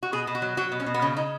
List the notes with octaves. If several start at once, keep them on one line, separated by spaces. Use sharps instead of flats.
F#4
B2 G#4
B2
F#4
F#3
F#3 F#4
B2
C#4
B2
B3
C#3 C#4
C#3 D#4